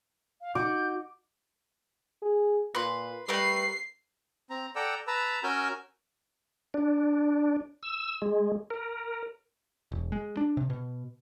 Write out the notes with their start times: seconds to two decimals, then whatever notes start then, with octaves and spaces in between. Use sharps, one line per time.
0.41 F5
0.55 D#4 F#4 D6 G6
2.22 G#4
2.75 A#2 B4 C6
3.29 G3 A3 A#4 B4 C7
4.50 C4 A#5
4.76 A4 D5 F#5 G5 A#5 E6
5.07 B4 A5 A#5 E6
5.43 C#4 F#4 A#4 G#5 E6 G6
6.74 D4
7.83 E6
8.22 G#3
8.70 A#4
9.92 E1
10.12 G#3
10.37 D4
10.57 C3
10.70 B2